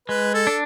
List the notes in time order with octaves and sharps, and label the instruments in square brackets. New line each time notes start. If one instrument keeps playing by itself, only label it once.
[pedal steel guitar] G#3 [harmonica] B4
[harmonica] A4
[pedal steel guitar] D4